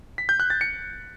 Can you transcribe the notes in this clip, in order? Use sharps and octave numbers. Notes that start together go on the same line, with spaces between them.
B6
G6
F#6
A6
C#7